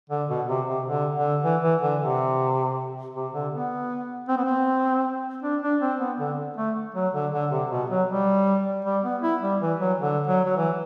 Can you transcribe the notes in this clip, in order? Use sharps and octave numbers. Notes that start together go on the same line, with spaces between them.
D3
B2
C3
C3
D3
D3
E3
E3
D3
C3
C3
D3
B3
C4
B3
C4
D4
D4
C4
B3
D3
A3
F#3
D3
D3
C3
B2
F#3
G3
G3
B3
E4
G3
E3
F#3
D3
F#3
F#3
E3